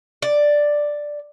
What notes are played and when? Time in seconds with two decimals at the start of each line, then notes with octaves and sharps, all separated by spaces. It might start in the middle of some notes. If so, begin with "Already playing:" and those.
0.22 D5